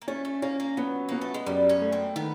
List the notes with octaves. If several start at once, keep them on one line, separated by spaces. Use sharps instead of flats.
A#3
A3 C#4
A3
A#3 C#4
A#3
F#3 B3
A#3 B3
A3
G#3
F#2 G3
C#4
A3
C4
D#3 B3